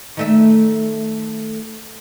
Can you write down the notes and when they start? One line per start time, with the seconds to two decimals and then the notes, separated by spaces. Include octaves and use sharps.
0.17 D#3 A3 E5